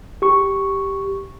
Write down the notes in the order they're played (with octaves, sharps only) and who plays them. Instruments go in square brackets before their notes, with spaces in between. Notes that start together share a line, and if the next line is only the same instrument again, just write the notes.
[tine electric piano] G4 C#6